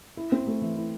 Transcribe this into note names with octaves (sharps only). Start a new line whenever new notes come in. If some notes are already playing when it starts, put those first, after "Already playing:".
E4
C4
A3
E3
E4